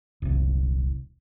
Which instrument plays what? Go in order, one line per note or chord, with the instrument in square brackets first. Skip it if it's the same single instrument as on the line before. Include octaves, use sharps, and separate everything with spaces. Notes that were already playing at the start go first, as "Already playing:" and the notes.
[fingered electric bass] D#1 C2